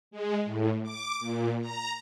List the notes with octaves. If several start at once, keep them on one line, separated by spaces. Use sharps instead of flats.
G#3
A2
D6
A#2
A#5